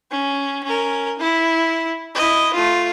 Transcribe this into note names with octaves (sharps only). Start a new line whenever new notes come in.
C#4
C#4 A#4
E4
E4 D#5
A3 F4